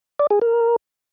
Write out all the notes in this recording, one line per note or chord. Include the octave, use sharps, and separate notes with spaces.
D5
G#4
A#4